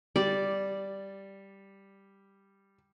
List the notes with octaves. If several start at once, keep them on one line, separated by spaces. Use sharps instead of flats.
G3 D5